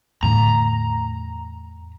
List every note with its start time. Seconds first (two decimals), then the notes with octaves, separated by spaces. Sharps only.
0.23 E2 A2 D3 A#5